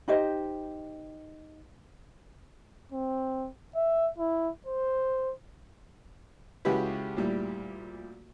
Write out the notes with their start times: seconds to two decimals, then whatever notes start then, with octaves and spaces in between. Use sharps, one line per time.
0.08 D#4 G4 C5 D#5
2.92 C4
3.76 E5
4.18 E4
4.66 C5
6.65 C#2 C#3 E4 F#4 G4 B4
7.17 D2 A#2 G3 E4